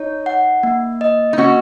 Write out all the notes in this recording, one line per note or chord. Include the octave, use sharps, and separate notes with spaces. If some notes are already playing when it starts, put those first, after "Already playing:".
Already playing: D#4 C#5
F#5
A#3
D#5
D#4
A#3 C#4 F#4